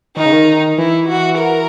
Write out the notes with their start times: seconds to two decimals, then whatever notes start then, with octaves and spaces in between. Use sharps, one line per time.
0.17 D#3 D#4
0.25 C#3
0.33 D#3
0.78 E3 E4
1.08 F#4
1.38 A#4